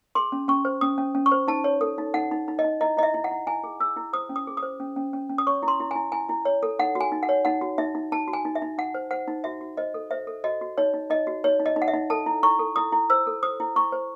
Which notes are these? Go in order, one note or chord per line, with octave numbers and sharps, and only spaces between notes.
G#4 C6
C#4
C#4 C#6
C5
C#4 D#6
C#4
C#4
C#6
C5
D#4 A5
C#5
A4
D#4
D#4 F#5
D#4
D#4
D#5
D#4
E4 D#5
E4 D#5
E5
E4
F#5
E4
E4 G#5
G#4
G#4 E6
E4
C5 D#6
C#4
D#6
G#4
D#6
C5
C#4
C#4
C#4
C#4
D#6
C#5 C#6
E4
C6
E4
E4 G#5
E4 G#5
E4
C#5
A4
D#4 F#5
F#4
G#5
D#4
F#5
C#5
D#4 F#5
F#4
D#4 E5
D#4
D#4 A5
F#4
G#5
D#4
E5
D#4
D#4 F#5
C5
C5 F#5
D#4
F#4 E5
F#4
C5 D#5
A4
C5 E5
A4
F#4 D#5
F#4
D#4 C#5
D#4
D#4 D#5
F#4
D#4 C#5
D#4
D#5
D#4
F#5
E5
D#4
A4 A5
E4
E4 C#6
A4
E4 D#6
E4
C5 E6
A4
C5 D#6
E4
E4 C#6
C5